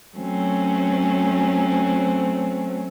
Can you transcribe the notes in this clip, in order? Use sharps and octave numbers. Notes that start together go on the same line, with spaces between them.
F#3 A3 C4 C#4